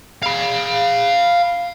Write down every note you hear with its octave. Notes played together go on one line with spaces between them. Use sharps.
F5 B5